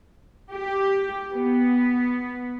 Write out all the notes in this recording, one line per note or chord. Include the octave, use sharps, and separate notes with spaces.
G4
B3